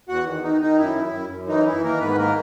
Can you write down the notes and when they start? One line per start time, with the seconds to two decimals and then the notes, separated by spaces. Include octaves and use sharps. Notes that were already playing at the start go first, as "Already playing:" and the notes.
0.09 E2 F#4 F#5
0.26 D#3
0.43 D#3 D#4
0.61 D#3 D#4
0.78 F#2 E4
0.96 F#2
1.13 F#2
1.31 F#2
1.48 E3 D#4
1.66 E3 E4
1.83 D#3 A#3 A#4
2.00 G#2 B3 B4
2.18 D#3 A#3 A#4